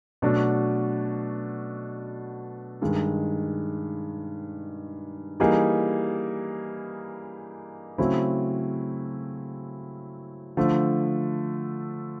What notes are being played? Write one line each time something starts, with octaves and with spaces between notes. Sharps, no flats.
B2 F#3 A3 D4 F#4
G2 D#3 G#3
E3 G3 A#3 D#4 G#4
C#3 F#3 A3 C4 E4
D3 F3 A3